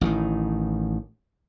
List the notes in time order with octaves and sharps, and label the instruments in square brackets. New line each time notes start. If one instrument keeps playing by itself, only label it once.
[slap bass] A1 A2 D3 D#3